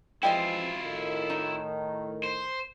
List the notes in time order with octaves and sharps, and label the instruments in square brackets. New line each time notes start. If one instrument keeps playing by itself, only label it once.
[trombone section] E3 F3 G#3 [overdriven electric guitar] E4 F4 [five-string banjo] G4 D#5 G#5
[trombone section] A2 D#3
[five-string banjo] D#4
[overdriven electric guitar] C5